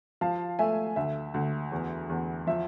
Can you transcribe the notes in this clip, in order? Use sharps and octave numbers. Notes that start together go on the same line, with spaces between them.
F3 F5 A5
A3 E5 G#5
D2 E5
D2
E2
E2
F3 E5